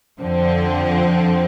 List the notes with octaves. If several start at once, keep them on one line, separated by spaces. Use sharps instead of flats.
F2 D3 F3 C4